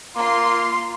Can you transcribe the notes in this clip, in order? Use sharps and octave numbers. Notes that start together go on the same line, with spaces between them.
A#3 F4 C6